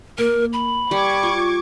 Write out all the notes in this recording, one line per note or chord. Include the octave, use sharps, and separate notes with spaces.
A#3 A#4
B5
G3 C#6 D6 G#6
F4